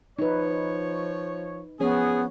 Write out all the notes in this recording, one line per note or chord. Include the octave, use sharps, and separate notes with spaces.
F3 D#4 B4 C#5
F3 B3 C#4 G#4 C#5